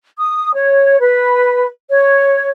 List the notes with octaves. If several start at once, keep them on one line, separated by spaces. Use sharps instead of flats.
D#6
C#5
B4
C#5